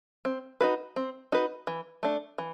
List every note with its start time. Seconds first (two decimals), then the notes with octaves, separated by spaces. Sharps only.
0.25 C4
0.61 D#4 F#4 B4
0.96 C4
1.32 D#4 F#4 B4
1.67 E3
2.03 A3 D4
2.38 E3